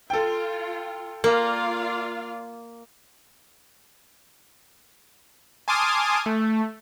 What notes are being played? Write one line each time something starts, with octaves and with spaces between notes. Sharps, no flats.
F4 A4 G5
A#3 F4 D5 F5
G#5 A5 C6 D6 D#6 F6
A3